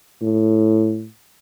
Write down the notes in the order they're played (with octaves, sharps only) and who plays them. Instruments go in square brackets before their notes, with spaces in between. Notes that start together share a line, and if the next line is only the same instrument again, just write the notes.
[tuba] A2